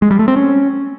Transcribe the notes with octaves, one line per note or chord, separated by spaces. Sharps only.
G#3
G3
A3
C4
C#4